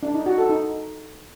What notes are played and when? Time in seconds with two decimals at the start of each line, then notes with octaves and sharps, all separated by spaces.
0.03 D4
0.14 D#4
0.26 F#4
0.38 A4
0.50 D#4